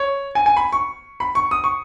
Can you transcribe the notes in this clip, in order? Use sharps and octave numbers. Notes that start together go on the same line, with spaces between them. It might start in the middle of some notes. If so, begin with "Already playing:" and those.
Already playing: C#5
G#5
G#5
B5
C#6
B5
C#6
D#6
C#6